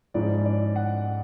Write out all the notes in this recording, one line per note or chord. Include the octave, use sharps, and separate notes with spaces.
G#2 F3 G#3 C#4 E4 D5
D5
F#5